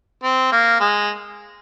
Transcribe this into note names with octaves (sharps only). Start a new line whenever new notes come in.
C4
A#3
G#3